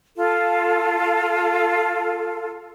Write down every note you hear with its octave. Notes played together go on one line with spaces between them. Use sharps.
F4 A4